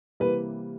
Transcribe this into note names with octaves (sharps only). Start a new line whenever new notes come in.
C3 E3 G3 A#3 B4